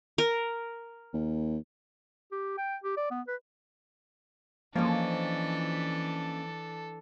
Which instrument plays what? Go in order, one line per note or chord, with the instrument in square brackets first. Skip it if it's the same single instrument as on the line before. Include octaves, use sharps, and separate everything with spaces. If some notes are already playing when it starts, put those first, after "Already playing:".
[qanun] A#4
[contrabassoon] D#2
[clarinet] G4
G5
G4
D5
B3
B4
[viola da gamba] E3 D4 [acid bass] F3 [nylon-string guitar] A#3 C#4 D#5 [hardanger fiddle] A4